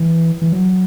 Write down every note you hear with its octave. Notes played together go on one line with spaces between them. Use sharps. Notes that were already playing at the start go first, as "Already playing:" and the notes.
Already playing: E3
E3
F#3